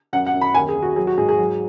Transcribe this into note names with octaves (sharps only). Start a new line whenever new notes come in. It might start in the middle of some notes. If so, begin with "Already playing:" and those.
F#2 F#5
F#5
F#2
B5
D#2 G#5
G#4
D#2
F#4
F#3 G#4
F#4
G#2 G#4
G#4
F#3